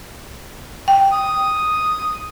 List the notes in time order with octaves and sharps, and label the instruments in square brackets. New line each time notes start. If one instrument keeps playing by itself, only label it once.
[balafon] G5
[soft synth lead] D#6